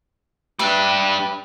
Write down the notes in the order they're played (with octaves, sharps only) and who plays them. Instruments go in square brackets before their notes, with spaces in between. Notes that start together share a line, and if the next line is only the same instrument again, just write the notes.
[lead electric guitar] G3 D4 [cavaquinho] G4 B4 E5